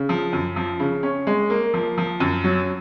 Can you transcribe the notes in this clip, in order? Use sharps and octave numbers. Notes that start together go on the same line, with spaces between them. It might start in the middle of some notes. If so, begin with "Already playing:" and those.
Already playing: C#3
F3
F#2
F3
C#3
C#4
G#3
A#3
F3
F3
F#2
F#3